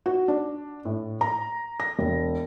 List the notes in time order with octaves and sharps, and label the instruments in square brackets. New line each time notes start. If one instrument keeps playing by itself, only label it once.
[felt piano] F#4
D4
A2
A#5
A#6
E1